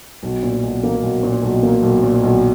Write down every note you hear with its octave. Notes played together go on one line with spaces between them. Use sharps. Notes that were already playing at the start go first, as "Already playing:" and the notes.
B1
A#2
B1
A#3
B1
A#2
B1
A#3
B1
A#2
B1